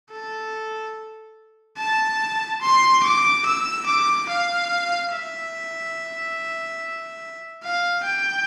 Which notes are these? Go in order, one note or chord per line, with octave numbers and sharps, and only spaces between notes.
A4
A5
C6
D6
E6
D6
F5
E5
F5
G5